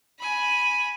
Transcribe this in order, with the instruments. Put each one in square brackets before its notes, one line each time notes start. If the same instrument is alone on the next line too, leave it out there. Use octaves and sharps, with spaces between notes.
[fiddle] G#5 B5